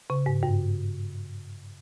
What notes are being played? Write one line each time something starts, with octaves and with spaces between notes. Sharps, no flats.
C#3
G#2
G2